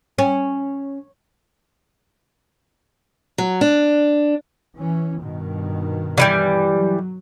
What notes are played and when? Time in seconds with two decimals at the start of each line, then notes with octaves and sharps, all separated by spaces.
0.18 C#4
3.38 F#3
3.61 D4
4.76 E3 C#4
5.20 G2 B2 D#3
6.18 D3 E3 G3
6.74 F#3